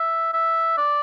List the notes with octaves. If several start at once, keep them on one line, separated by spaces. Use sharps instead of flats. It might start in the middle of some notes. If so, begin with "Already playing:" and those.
Already playing: E5
E5
D5